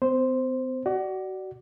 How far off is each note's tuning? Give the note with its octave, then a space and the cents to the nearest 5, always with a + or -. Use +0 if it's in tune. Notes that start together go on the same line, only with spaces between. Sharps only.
C4 -45 C5 +0
F#4 +30 D5 +5